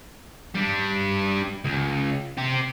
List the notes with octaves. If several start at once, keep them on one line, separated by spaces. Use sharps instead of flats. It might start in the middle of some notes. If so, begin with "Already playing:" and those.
G3 D4
C#2
C4 G4